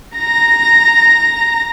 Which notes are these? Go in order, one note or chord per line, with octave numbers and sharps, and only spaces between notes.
A#5 A#6